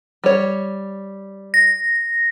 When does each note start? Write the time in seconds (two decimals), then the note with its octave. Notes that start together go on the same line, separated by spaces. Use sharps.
0.24 G3 C#5
1.54 A#6